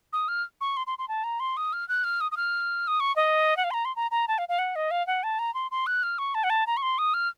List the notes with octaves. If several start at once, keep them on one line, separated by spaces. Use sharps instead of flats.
D#6
F6
C#6
C6
C6
C6
A5
A#5
C6
D#6
F6
F#6
F6
D#6
D#6
F6
D#6
C#6
D#5
F#5
F5
C6
A#5
C6
A#5
A#5
A5
F5
F5
F#5
D#5
F5
F#5
A5
A#5
C6
C6
F#6
F6
C#6
A5
F#5
A5
A#5
C#6
C6
D#6
F6